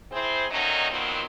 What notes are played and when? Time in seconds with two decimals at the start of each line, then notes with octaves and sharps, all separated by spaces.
0.12 C4 E4 G#4 C5
0.50 D3 D#3 F#3 A3 C#4 D#4
0.90 A#2 D#3 F3 F#3 B3 C4